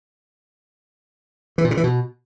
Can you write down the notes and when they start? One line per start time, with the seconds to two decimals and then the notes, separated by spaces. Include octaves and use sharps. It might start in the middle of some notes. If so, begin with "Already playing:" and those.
1.58 E3
1.64 A#2
1.71 C#3
1.77 E3
1.84 B2